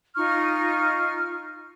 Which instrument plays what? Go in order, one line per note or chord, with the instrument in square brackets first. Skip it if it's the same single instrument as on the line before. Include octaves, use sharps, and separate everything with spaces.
[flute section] D#4 F4 C#6 F6